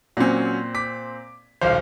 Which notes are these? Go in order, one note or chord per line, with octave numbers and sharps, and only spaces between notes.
A#2 F#3 C4 C#4
D6 B6
D#1 B1 C5 F5